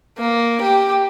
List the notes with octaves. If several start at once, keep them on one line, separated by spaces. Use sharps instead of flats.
A#3
G4